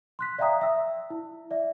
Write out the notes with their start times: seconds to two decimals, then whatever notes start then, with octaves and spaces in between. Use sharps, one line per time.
0.19 C6 F#6 B6
0.39 D5 E5 F5 G5 A#5 D#6
0.61 E5 E6
1.10 E4
1.51 D5 E5